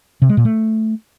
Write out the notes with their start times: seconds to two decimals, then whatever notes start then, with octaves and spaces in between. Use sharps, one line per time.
0.22 C3
0.29 G#3
0.37 A#2
0.45 A3